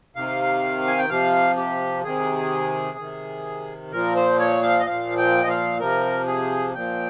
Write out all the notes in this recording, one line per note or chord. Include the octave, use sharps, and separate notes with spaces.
C3 D#3 F5
G#5
G5
C3 F3 F5
G4
C3 D#3 G#4
C3 D#3
A#2 F3 A#4
C5
C#5
F5
D#5
A#2 F3 F5
G5
D#5
F5
C3 F3 A#4
G#4
A#2 F3 G5